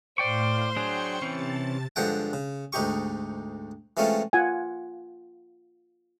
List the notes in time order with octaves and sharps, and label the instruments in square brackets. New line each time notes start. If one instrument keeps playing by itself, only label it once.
[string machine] A2 F5 [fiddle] C5 C6 [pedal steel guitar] D5 G5 C#6
[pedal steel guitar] F#3 D4 G#4 [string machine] G5 C#6 C#7
[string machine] C3 A5 A6 [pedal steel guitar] E3 C4 C#4
[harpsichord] G2 D3 F3 G#3 F#5 G5
C#3
D2 G#2 D#4 G4 C#6
E3 G#3 A3 C4 C#4 F4
[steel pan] F4 F#5 G#5